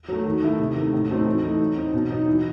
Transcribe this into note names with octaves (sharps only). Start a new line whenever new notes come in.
F#3 A3
D#3
A3 E4
C3
D#3 A3
A2
F#3 A3 C4 D#4
E3
A3 D#4
F#3
C4 D#4
B2
F#3 B3 D#4
E3